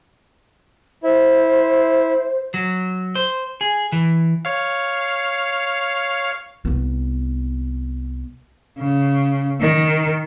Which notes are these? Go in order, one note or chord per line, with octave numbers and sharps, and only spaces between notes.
E4 C5
F#3
C5
G#4
E3
C#5 F5
C2 B3
C#3
D#3